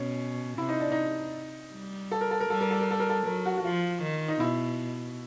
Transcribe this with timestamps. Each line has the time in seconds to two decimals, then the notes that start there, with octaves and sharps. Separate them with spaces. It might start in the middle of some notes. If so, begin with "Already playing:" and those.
Already playing: B2 C#4
0.58 C3 E4
0.69 D#4
0.80 D4
0.92 D#4
1.72 G3
2.11 A4
2.21 A#4
2.31 A4
2.40 A#4
2.49 G3 A4
2.61 A#4
2.71 A4
2.81 A#4
2.91 A4
3.00 A#4
3.10 A4
3.26 F#3 A#4
3.45 F#4
3.58 F#4
3.64 F3 F4
4.03 D#3
4.28 D#4
4.40 B2 E4